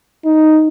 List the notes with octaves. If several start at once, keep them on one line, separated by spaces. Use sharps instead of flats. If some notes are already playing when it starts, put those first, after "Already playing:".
D#4